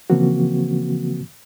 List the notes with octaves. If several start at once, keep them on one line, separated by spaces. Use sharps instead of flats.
C#3 E3 F3 A#3 C4 F#4